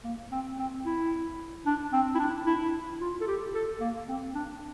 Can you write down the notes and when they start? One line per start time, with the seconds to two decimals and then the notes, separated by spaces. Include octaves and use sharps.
0.04 A#3
0.32 C4
0.59 C4
0.86 E4
1.66 D4
1.93 C4
2.15 E4
2.19 D4
2.46 E4
3.01 F4
3.21 A4
3.27 G4
3.55 A4
3.80 A#3
4.08 C4
4.35 D4